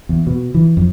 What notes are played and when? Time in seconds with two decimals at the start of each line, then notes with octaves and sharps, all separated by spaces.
0.09 E2
0.27 B2
0.54 E3
0.77 F2